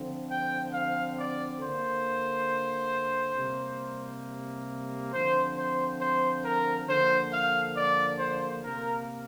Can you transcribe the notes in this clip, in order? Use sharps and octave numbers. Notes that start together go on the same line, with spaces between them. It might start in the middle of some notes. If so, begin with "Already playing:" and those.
Already playing: D3 F3 C4
G5
F5
D5
D3 A#3 C5
C3 G3 A#3
D3 F3 C4 C5
C5
C5
A#4
D3 F3 A#3 C5
F5
D5
C5
C3 A#3 A#4